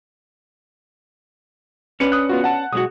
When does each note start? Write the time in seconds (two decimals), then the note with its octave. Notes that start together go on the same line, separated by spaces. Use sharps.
2.00 C#4 D4 B4 C#7
2.12 D#6 F#6
2.29 B3 F4 F#4
2.44 F#5 A5
2.73 B1 G#3 F#4 D#6